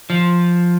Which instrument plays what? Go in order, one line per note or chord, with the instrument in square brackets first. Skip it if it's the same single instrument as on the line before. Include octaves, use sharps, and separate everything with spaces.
[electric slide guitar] F3